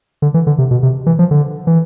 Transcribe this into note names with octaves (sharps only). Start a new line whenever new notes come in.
D3
E3
D3
C3
B2
C3
E3
F3
D3
E3